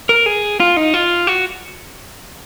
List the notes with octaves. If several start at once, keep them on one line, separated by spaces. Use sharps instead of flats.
A#4
G#4
F4
D#4
F4
F#4